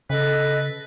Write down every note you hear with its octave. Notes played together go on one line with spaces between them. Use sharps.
C#3 A4 B4 D#5